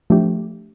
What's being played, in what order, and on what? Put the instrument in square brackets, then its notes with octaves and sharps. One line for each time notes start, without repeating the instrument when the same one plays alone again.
[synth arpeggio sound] F3 A3 D4 G4